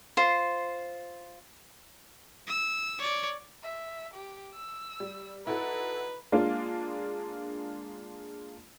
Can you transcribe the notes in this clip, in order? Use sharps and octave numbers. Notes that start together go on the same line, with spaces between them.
F4 C5
E6
C#5 D5
E5
G4
E6
G3
D#4 E4 F#4 A4 B4
G#3 A#3 D4 F4